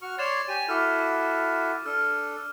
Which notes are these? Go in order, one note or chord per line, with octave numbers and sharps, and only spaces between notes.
F#4 C#6 F6
C#5 D5 C6 A6 E7 F7
G4 G#5 D#7
E4 F#4 A4 D6 F6
D4 A4 F6